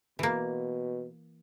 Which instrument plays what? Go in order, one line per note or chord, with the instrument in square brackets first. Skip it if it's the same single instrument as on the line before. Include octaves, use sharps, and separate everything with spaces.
[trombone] B2 [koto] E3 A#3